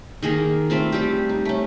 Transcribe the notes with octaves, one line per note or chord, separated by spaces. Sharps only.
D#3 A#3 G#4 A#4
A3 C4 F4
G3 G4
D#4
A3 C#4